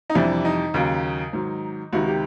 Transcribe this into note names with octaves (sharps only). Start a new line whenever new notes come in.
D#4
F2 C3 E3 G3 D4
D#4
D#2 C#3 F#3
G#2 D#3 F#3
C#2 C3 D#3 F#4
G4